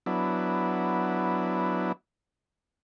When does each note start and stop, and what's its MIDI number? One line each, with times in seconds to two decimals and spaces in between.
0.06 1.92 54
0.06 1.92 59
0.06 1.92 62
0.06 1.92 64